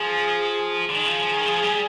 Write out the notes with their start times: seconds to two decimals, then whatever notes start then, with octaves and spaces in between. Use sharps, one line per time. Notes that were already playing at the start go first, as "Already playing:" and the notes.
Already playing: F3 G#4
0.90 D3
0.95 D#3 G#4
1.07 F3
1.22 F3
1.33 D#3
1.45 F3
1.63 G3